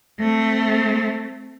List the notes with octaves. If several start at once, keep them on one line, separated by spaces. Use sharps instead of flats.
A3 C4